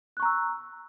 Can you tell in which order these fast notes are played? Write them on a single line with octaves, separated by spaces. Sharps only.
F#6 C#6 A#5 E6